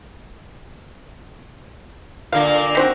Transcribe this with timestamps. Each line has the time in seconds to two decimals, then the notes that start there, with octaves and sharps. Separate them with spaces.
2.32 A#2 D3 A#3 F5
2.75 D#3 C4 F#4